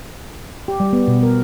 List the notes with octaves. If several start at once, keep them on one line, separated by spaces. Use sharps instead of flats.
G4
G3
B3
B2
A#4